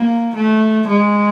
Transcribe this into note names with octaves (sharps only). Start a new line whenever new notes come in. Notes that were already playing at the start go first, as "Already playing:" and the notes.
Already playing: A#3
A3
G#3